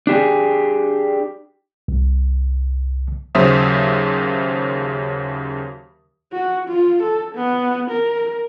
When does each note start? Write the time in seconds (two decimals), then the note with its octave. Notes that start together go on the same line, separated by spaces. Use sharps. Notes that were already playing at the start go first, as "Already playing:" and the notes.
0.07 D4 G4 G#4
1.88 C2
3.35 D#2 C#3 F#3 C5 E5 D#6
6.33 F#4
6.67 F4
7.03 A4
7.35 B3
7.91 A#4